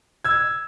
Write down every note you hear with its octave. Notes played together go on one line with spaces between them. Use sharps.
E6 G#6